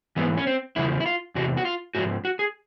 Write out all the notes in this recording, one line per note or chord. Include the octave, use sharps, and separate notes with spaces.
G#2 E3 B3
C#4
C4
E2 C#3 F3 E4
E4
F4
E2 C3 F#4
F#4
F4
G#2 F3 F#4
F#4
G#4